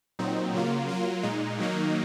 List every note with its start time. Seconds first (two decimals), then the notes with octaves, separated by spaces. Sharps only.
0.19 A#2 F#3 C4 D#4
0.53 C#3 F#3 A#3 F4
0.89 F#3 A#3 F4
1.23 A#2 G#3 D#4
1.58 D#3 F#3 A#3 D#4